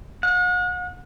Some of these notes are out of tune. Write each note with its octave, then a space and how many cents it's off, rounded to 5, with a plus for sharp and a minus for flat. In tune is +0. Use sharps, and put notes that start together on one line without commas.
F#5 -40